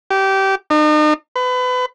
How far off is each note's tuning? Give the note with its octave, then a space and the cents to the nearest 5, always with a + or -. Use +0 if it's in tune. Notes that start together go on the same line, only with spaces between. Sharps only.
G4 -20
D#4 -40
B4 +30